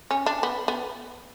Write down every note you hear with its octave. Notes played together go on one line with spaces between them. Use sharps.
C#4
D4
B3
B3